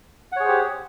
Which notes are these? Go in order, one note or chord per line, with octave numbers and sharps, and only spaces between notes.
G4 G#4 C5 C#5 F#5